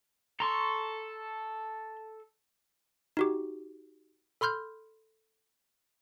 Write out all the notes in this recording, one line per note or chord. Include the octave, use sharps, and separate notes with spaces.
A4 A#5 C6 C#6
D#4 F#4 G4
A4 B5 C6 F6 G6